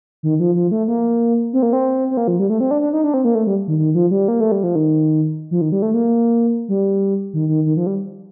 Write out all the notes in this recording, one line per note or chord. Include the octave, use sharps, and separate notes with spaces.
D#3
F3
F3
A3
A#3
C4
A#3
C4
C4
A#3
F3
G3
A3
C4
D4
D4
D#4
D4
C4
A#3
A3
G3
D#3
D#3
F3
G3
A#3
A3
G3
F3
D#3
F3
D#3
G3
A3
A#3
G3
D#3
D#3
D#3
F3
G3